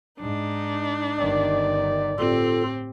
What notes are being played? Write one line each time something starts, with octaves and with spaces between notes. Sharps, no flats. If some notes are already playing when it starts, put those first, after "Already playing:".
G#2 D4 D#4
G1 D#3 D5
A2 C4 F4 G4 A4